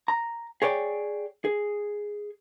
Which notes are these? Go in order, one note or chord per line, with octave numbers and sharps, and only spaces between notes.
A#5
G#4 C#5 D5 F#5 G5
G#4